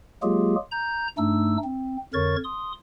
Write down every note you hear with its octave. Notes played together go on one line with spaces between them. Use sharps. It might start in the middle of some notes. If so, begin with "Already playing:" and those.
F#3 G#3 A#3 F4 G4 G#4
A#5 G6
G2 A3 D4 D#4 E6
C4
F2 D3 A#4 C#5 C#6 A6
C6 D#6